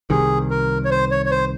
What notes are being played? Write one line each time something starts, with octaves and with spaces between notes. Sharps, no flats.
C2 C3 D#3 G3 G#4
A#4
C#5
C5
C#5
C#5
C5